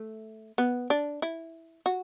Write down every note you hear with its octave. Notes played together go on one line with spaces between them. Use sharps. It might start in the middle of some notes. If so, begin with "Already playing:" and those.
Already playing: A3
B3
D4
E4
F#4